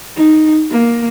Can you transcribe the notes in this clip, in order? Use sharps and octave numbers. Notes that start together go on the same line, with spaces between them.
D#4
A#3